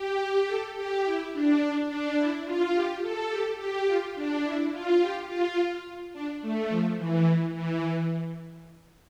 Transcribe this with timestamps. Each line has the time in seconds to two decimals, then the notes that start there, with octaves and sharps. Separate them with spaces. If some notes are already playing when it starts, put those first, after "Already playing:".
Already playing: G4
0.47 A4
0.76 G4
1.05 E4
1.33 D4
1.61 D4
1.89 D4
2.17 E4
2.45 F4
2.74 G4
3.02 A4
3.31 G4
3.58 G4
3.87 F4
4.16 D4
4.44 E4
4.72 F4
5.01 G4
5.29 F4
6.13 D4
6.42 A3
6.69 F3
6.98 E3
7.55 E3
7.82 E3